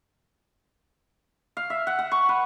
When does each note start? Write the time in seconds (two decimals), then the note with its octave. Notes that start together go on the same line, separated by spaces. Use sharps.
1.57 F5
1.70 E5
1.87 F#5
1.99 F#5
2.12 C#6
2.29 B4